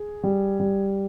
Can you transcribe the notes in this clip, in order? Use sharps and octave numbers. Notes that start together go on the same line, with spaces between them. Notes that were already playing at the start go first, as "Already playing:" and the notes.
Already playing: G#4
G3
G3